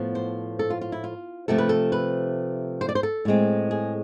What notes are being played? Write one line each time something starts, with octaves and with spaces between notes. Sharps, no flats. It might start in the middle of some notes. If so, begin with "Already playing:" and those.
Already playing: A2 F3 B3
C5
A4
F4
F4
E4
F4
C3 F3 A3 A4
B4
A4
B4
C5
D5
C5
A4
A2 G#3 C4
G#4